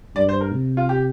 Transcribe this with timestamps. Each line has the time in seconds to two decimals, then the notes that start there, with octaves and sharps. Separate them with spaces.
0.15 G2 D5
0.29 C5
0.41 A#4
0.52 C3
0.77 F4
0.89 G4